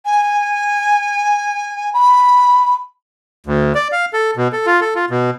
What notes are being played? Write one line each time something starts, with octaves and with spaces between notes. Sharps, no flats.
G#5
B5
D2
D5
F5
A4
B2
A4
F4
A4
F4
B2